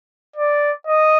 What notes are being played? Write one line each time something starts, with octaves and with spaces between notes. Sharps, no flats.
D5
D#5